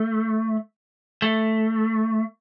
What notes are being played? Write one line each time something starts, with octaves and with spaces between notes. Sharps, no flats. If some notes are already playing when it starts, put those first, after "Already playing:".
Already playing: A3
A3